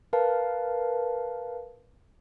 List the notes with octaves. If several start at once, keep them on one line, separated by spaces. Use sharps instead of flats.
A#4 B4 F5 A5